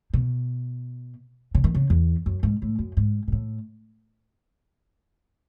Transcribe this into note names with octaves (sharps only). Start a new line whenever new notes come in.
B2
C#3
D#3
C#3
E2
F#2
G#2
A2
F#2
G#2
B2
A2